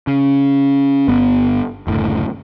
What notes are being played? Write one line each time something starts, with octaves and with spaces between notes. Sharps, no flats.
C#3
G1 B3
F#1 D2 A2